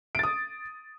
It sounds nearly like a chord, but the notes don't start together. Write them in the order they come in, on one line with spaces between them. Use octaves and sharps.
D7 A6 D#6